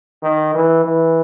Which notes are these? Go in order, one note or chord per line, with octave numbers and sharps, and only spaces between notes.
D#3
E3
E3